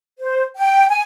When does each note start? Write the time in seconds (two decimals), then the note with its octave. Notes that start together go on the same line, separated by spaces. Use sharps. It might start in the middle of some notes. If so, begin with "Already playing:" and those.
0.19 C5
0.57 G5
0.90 G#5